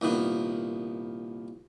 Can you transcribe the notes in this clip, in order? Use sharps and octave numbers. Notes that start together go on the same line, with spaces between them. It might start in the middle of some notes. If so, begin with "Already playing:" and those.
C2 A#2 D#3 B3